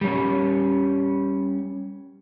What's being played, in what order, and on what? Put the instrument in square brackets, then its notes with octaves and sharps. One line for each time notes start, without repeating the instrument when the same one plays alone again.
[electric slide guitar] G3 C#4